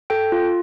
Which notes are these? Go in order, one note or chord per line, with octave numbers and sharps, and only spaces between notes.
A4 G5
F4